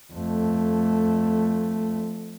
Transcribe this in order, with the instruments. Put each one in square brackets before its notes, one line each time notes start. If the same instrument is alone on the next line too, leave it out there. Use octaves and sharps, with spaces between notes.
[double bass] F2 A3